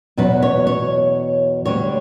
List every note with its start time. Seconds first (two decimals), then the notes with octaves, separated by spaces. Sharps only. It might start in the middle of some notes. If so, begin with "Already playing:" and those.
0.17 E2 B2 F#3 B4
0.42 C#5
0.67 C#5
1.65 D2 D3 G3 C#5